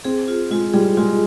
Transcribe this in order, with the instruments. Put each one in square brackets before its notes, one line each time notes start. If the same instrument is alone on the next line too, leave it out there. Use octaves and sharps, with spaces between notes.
[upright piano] C4 [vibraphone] G#4
[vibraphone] F4
[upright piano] G#3 [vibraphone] F4
[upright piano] G3 [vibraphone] G#4
[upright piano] G#3 [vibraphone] F4